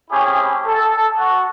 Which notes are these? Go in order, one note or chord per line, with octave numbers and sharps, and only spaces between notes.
A3 C4 C#4 E4 G4 G#4
A4
F#4